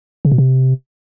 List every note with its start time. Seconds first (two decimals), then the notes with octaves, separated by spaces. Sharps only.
0.25 C#3
0.32 B2
0.38 C3